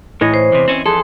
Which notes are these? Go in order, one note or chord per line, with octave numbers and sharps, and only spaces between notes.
A2 E3 C#5 D#5
C5
E2 C3
C4 C#4
F2 G#4 A4 C6